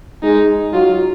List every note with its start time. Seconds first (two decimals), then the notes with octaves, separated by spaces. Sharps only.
0.23 G#3 D#4
0.73 F#3 F4